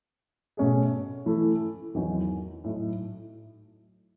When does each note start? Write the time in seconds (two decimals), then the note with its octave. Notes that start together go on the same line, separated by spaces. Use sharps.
0.57 B2 A3 C#4 G#4
1.26 E3 A3 E4 A4
1.95 E2 D#3 F#3
2.64 A2 F#3 A3 D#4